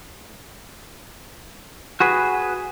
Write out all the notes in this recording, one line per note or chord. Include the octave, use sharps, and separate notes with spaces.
F#4 G#4 B4